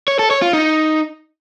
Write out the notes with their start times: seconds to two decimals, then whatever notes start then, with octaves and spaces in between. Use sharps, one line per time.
0.08 C#5
0.19 A4
0.31 C#5
0.42 F4
0.53 D#4